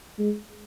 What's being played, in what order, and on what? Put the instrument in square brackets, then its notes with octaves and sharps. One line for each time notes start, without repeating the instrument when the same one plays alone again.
[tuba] G#3